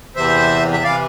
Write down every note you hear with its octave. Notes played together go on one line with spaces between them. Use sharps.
E2 C3 E3 C5 E5
E5
C3 E3 D5 F5